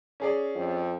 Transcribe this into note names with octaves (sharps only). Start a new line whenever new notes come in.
C#4 G#4 D5
F2